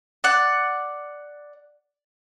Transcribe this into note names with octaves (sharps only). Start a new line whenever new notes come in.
D5 F#5